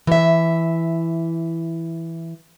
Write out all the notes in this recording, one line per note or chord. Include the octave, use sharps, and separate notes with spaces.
E3 E5